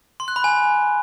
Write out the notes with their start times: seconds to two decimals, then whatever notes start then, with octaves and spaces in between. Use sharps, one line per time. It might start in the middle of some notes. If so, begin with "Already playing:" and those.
0.20 C6
0.28 F#6
0.36 B5
0.44 G#5